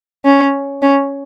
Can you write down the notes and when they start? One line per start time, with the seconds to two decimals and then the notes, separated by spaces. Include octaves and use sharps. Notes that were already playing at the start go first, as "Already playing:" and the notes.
0.25 C#4
0.82 C#4